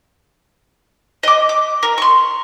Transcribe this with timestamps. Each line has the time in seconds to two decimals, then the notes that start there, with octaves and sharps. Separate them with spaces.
1.23 D#5 D6
1.49 D6
1.83 A#4
1.98 C6 C#6